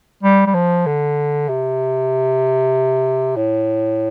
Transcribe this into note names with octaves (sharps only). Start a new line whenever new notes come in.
G3
G3
F3
D3
C3
A2